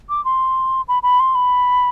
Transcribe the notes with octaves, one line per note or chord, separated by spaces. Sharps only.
D6
C6
B5
B5
C6
B5